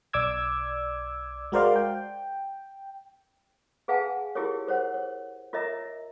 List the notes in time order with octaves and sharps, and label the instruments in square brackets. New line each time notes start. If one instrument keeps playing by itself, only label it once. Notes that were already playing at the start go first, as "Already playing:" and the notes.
[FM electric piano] B1 D5 D6 E6 G#6
G#3 F#4 A#4 C5 D5 F5
G5
[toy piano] G#4 B4 F5 F#5 G#5 A5
E4 F4 G4 G#4 A#4 C#5
A#4 C5 C#5 F#5
C#5
F4 A#4 C#5 D#5 E5 A#5